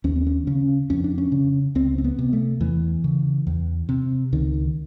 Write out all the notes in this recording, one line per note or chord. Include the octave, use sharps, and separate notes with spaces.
D#2 C#4
C4
C#4
C#3 C#4
F2 C#4
D4
C#4
C#3
C#2 C4
C4
B3
C3
A3
E2 E3
C#3
E2
C3
C#2 D#3